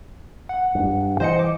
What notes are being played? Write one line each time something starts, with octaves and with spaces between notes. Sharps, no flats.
F#5
G2
E3 C5 D#5 C#7
D6